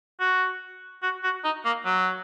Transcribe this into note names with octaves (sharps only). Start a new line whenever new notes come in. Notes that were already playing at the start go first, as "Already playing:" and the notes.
F#4
F#4
F#4
D#4
A#3
F#3